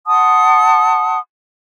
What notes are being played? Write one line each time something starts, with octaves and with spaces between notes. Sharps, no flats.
F#5 A5 C6 D#6